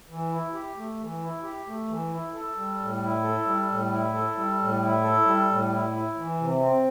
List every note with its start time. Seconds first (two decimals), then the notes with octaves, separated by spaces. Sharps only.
0.09 E3
0.31 E4
0.53 G4
0.77 A3
0.99 E3
1.22 E4
1.43 G4
1.67 A3
1.88 E3
2.11 E4
2.33 A4
2.55 G3
2.79 A2
3.01 E4
3.23 A4
3.46 G3
3.68 A2
3.90 E4
4.13 A4
4.35 G3
4.59 A2
4.81 E4
5.03 A4
5.26 G3
5.49 A2
5.70 E4
5.93 E4
6.16 E3
6.38 C3
6.60 C4